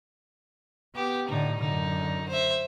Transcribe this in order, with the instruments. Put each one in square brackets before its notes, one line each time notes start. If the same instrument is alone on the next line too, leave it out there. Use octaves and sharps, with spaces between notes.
[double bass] B3 [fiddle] G4
[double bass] A2 D3 [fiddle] D#4
[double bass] F#2 D3 [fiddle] D#4
[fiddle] C5 E5